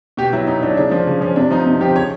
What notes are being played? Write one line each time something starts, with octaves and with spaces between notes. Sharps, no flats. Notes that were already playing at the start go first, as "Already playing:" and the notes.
B2 G4
F#3 E4
B2 D#4
F#3 D4
C#3 D4
F3 D4
C#3 C#4
F3 C#4
C3 D4
F3 D#4
C3
F3 G4
C#3 C#5